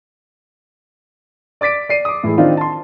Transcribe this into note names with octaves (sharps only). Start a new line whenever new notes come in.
D5 D6 A6 B6 D7
D5 C7 D#7
D6 D#6
A2 E3 G#3 E4
D#3 C4 D4 D#4 F4
A5 C6